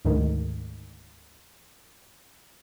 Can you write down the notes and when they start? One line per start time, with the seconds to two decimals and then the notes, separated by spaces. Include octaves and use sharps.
0.05 D2 G#2 D#3